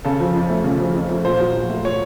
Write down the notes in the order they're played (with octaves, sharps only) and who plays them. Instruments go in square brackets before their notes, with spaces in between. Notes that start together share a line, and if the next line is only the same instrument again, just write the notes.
[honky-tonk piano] C#3 [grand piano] A4
[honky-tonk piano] F3
F2
A3
C#3
F3
F2
A3
[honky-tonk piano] A#2 [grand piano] C5
[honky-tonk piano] F#3
A#1
A3
[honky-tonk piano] A#2 [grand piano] C#5